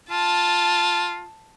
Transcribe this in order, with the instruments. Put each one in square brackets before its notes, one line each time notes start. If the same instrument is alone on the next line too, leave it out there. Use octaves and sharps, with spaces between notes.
[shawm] F4 [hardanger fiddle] A5